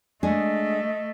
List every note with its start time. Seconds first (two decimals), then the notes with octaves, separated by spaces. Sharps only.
0.23 G#3 A3 D4 G#4 D#5